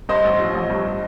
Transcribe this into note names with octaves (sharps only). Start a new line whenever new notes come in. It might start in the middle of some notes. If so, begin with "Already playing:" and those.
G2 C5 D#5
A1
F3
A1
G2